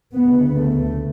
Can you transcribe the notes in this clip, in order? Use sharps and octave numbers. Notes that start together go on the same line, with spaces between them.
D2 C#3 B3
A3